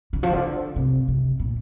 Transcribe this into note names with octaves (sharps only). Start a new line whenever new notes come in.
D3
F3
D3
C3
C3
A#2